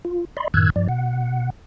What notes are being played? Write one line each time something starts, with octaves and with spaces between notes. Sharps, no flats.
F4
D5 D#5 B5 C6
F#2 A2 D#3 E6 F#6 G#6
G2 F3 D5
B2 F#5